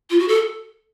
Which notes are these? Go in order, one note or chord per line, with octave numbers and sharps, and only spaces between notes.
F4
F#4
A4